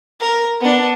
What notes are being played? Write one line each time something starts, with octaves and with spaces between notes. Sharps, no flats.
A#4
B3 D4